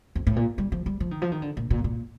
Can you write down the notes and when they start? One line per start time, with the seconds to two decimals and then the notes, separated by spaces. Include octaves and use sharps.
0.15 F2
0.27 A2
0.36 A#2
0.58 G3
0.72 F3
0.86 G3
1.00 F3
1.11 D#3
1.22 F3
1.32 D#3
1.42 D3
1.57 A#2
1.70 A#2
1.84 A#2